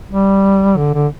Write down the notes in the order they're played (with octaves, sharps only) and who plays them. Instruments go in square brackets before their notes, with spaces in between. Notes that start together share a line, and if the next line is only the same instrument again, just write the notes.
[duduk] G3
D3
D3